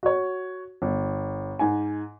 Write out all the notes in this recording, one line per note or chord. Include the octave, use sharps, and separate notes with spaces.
F#4 C#5
G1
G#2 G#5